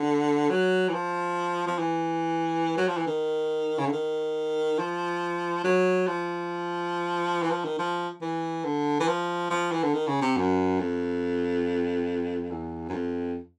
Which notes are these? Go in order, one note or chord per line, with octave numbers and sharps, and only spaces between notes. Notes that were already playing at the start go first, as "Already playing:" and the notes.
Already playing: D3
F#3
E3
F3
F3
E3
F#3
F3
E3
D#3
C#3
D3
D#3
F3
F#3
F3
E3
F3
D#3
F3
E3
D3
E3
F3
F3
E3
D3
D#3
C#3
C3
F#2
F2
E2
F#2
F2